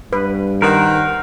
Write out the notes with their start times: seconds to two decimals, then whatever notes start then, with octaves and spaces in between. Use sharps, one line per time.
0.13 G2 B4
0.62 D#3 A#4 C5 F#5